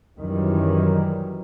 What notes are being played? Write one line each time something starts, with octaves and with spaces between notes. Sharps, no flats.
F#2 D#3 E3 F#3 G3